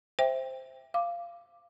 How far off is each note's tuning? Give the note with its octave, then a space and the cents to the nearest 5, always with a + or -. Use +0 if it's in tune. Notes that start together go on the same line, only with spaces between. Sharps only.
C5 +0 E5 +0 G5 +20
F5 -15 D6 +5